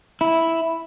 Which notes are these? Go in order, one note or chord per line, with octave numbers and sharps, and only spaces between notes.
E4